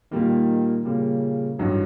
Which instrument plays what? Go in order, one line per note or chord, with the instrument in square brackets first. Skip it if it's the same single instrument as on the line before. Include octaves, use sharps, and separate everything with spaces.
[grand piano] A#2 G3 A#3 [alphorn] D#3
[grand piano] A#2 G3 A#3 [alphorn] C#3
[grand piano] A1 G2 D#3 F#3